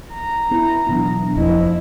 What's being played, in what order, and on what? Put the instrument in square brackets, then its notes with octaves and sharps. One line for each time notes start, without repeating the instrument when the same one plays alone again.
[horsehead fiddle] A#5
[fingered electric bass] B3 [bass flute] E4
[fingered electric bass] B2 E3 F#3 [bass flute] B3 [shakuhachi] D4
[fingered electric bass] F#1 F2 A#3 [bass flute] F3 [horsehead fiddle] E4 [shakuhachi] D#5